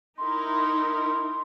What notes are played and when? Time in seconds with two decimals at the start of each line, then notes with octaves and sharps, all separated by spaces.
0.18 D#4 E4 A#4 C6